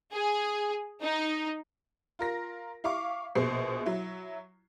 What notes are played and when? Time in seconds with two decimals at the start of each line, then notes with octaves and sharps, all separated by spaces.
0.13 G#4
1.02 D#4
2.19 F4 A#4 A#6
2.84 E4 F5 C#6 D6
3.35 A#1 B2 G#4 C5 C7
3.86 F#3 E4